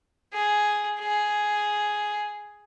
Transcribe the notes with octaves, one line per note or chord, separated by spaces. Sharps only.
G#4
G#4